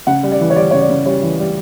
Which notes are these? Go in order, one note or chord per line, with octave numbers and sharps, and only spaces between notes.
C#3 F#5
G3
D5
E3
C#5
G3 D5
C#3 C#5
D5
C#3
G3 C#5
E3
G3